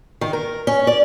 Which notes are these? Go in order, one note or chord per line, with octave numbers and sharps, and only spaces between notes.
D#3
A#4
C#4
D5